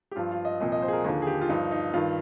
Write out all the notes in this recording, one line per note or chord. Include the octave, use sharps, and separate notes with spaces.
G4
G2 F3 F4
F4
D#5
C2 A#2 F3 D#5
D#5
C5
G#4
A#4
D#2 D3 F3 G#4
G#4
G4
F4
G2 F3 D#4
D#4
G2 D#3 F4